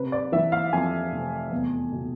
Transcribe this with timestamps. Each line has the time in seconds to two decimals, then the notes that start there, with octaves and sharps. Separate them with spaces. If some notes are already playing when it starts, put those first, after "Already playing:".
Already playing: C3 B4
0.12 D5
0.32 E3 E5
0.52 F5
0.73 F2 G#5
1.12 F1
1.51 E2
1.92 B2